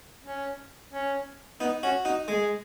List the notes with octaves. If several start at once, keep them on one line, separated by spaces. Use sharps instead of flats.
C#4
C#4
B3 D#4
C#4 F#4
D#4 F#4
G#3 G#4